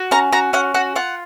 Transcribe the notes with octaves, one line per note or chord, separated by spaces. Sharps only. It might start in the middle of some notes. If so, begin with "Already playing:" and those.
Already playing: F#4
C#4 A#5
F#4 A#5
C#4 F#5
F#4 F#5
F4 F#5